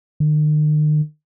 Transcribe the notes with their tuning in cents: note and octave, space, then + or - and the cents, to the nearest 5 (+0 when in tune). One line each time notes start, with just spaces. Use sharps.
D#3 -45